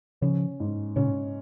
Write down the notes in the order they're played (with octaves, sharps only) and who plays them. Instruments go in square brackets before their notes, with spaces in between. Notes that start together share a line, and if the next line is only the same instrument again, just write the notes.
[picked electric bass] C#3 F3 [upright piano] C#4
[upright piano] G#2
[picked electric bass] A#2 C#3 [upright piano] C#4